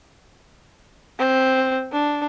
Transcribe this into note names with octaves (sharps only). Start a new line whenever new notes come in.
C4
D4